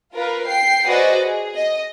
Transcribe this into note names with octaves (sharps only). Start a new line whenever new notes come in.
F4 A#4 B4
G5 C7
F#4 G#4 B4 C5 D5 D#5
G#4
D#5